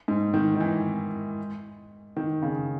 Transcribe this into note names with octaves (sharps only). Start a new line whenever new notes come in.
G#2
D#3
D#3
E3
D#3
C#3